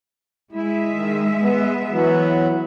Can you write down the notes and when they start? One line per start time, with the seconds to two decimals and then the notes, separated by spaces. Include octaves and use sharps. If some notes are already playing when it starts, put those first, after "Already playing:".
0.52 G#3 E4 E5
0.92 D#3
1.41 B3
1.89 E3 F#3 B3